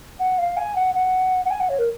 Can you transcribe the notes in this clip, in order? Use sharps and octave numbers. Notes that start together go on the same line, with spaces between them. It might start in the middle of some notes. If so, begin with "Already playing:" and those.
F#5
F5
G#5
F#5
F#5
F#5
G#5
F#5
C#5
A#4